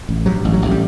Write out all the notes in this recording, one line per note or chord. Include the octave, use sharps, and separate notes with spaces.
A1
G2 F#3
A1
F#3
A1
G3